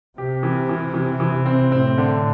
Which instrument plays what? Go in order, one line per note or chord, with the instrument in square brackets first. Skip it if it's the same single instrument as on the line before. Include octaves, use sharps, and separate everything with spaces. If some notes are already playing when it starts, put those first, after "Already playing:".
[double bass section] C3 [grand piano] G4
[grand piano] E3
E3
E3
E3
C4
[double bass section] A2 [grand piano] C4
[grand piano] D3